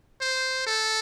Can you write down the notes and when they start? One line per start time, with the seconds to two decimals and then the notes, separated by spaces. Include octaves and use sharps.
0.21 C5
0.66 A4